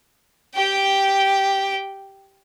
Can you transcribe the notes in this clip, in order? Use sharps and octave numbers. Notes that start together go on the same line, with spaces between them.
G4 G5